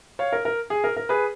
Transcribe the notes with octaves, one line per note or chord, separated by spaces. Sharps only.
C#5 F5
A#4
A#4
G#4
A#4
A#4
G#4 B4